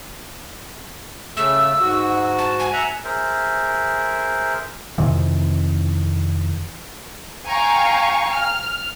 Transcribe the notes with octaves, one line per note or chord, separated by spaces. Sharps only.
C#3 A3 E6
G#2 F#4
A5
G#5
E5 F#5 A#5
G#4 A#4 C5 E5
F2 C3 D#3 E3
F5 G5 G#5 A#5 C#6
F6